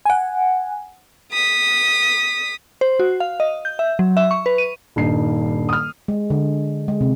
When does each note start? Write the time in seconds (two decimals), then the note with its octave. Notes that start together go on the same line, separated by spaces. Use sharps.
0.05 F#5 G#5
1.32 D#6 B6
2.81 C5
3.00 F#4
3.20 F5
3.40 D#5
3.65 G6
3.79 E5
3.99 F#3
4.17 E5
4.31 C#6
4.46 B4
4.58 D#7
4.96 D#1 G2 D#4 C7
5.69 D#6 F6
6.08 G#3
6.30 D3
6.88 G#3
7.01 C3